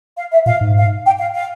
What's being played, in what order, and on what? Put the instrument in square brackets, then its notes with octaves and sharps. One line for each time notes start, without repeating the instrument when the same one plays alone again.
[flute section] F5
E5
[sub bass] A#2 [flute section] F5
[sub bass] G#2
[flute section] F5
G5
F5
F5